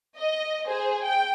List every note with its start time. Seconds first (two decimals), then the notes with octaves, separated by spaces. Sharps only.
0.17 D#5
0.67 G#4 C5
1.02 G5